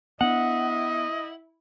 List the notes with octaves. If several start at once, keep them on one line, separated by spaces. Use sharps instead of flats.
B3 D4 E4 D#5 F#5